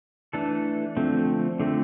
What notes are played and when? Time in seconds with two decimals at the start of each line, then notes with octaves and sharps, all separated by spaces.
0.33 E3 A3 D4 A4
0.97 D3 F3 A3 C4
1.60 D3 F3 A3 C4